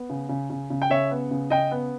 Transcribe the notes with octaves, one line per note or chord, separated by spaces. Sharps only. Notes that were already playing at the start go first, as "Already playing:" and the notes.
Already playing: B3
C#3
C#3
C#3
C#3
G5
C#3 C#5 E5
B3
C#3
C#3 D#5 G5
B3